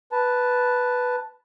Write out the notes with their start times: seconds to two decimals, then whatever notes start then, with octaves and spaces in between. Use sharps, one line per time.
0.12 B4 A5